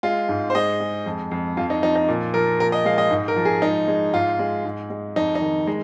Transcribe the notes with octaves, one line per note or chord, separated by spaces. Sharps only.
G#3 F4
G#2
C5
G#3 D#5
G#3
F2
F2
F2 F4
D#4
F3 D#4
D#4
A#2
F3 A#4
A#2 A#4
D#5
G#3 F5
D#5
G#2
A#4
F3
G#4
G#3 D#4
G#3
G#2 F4
G#3
G#2
G#3
F2 D#4
D#4
D#3
G#3